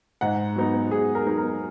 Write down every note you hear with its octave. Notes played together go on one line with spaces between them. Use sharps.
G#2 F#5
F#3 B3 D#4
G#2 G#4
A#4
F#3 B3 D#4
A#4